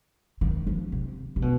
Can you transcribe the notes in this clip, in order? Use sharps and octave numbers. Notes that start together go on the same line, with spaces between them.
D#3
F3
C3
C3
B2